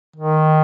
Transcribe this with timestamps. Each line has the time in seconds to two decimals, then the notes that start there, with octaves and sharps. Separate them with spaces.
0.16 D#3